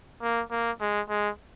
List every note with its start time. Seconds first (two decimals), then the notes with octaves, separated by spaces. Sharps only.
0.22 A#3
0.51 A#3
0.81 G#3
1.09 G#3